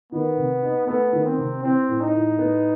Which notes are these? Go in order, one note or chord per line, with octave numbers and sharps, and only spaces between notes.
D#3 B3
C3
D#4
A3 B3
D#3
C4
C3
E3 C4
A2
D#4
A2
B3